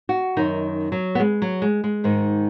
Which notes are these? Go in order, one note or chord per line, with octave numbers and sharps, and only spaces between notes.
F#4
F#2 D#3 D#4
F#3
B3
G#3
F#3
G#3
G#3
G#2 D#3